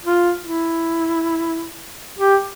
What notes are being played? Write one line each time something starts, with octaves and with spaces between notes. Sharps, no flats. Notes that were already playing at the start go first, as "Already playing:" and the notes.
F4
E4
G4